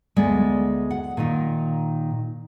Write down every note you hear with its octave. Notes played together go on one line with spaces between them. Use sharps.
D2 G#3 B3 D5
F#5
A#2 D#3 D#4